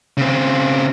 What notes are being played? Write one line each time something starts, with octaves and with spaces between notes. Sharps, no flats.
C#3 C4